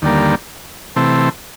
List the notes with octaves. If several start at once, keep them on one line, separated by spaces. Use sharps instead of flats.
D#2 D3 G3 A#3
C3 E3 A3 C4